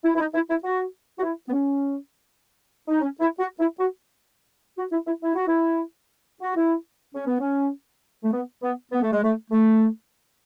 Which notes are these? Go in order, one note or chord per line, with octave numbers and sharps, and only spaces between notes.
E4
E4
D#4
E4
E4
F#4
F#4
E4
B3
C#4
D#4
C#4
E4
F#4
E4
F#4
F#4
E4
E4
E4
F#4
E4
F#4
E4
C#4
B3
C#4
A3
B3
B3
B3
A3
G#3
A3
A3